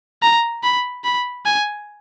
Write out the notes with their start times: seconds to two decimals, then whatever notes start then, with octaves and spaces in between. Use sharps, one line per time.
0.22 A#5
0.63 B5
1.04 B5
1.46 G#5